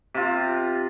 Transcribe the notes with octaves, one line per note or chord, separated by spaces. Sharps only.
C3 F4